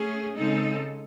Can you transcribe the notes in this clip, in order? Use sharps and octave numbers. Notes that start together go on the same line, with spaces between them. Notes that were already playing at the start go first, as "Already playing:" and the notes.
Already playing: A3 C#4 G#4
C#3 G#3 C4 D#4 A4